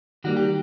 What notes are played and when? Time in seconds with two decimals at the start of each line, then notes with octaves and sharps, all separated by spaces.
0.24 D#3 G3 A#3 F#4
0.36 G4